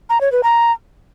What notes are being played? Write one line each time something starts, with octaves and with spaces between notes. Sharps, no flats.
A#5
C#5
B4
A#5